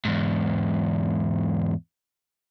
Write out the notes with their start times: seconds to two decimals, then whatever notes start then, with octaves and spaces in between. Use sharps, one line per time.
0.05 E2 G#2